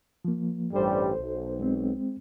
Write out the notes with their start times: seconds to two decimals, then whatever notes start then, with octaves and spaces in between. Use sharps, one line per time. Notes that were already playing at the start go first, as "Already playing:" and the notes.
0.25 F3 A#3
0.73 A1 G2 G3 A4 C5
1.19 B1
1.60 G#3 C4